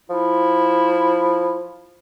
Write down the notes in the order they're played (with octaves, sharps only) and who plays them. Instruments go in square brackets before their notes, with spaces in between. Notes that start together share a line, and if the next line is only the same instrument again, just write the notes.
[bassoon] F3 [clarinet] E4